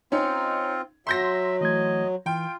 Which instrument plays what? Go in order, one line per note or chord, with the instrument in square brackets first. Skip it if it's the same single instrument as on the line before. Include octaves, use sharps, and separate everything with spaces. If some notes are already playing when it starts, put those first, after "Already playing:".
[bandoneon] C4 F4 [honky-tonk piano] C#4 D#4
[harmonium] F#3 [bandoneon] E5 [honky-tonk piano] C6 G6 A#6
[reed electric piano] E3 A3 G#6 [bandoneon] D#5
[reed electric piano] E3 [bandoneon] F4 [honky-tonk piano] G5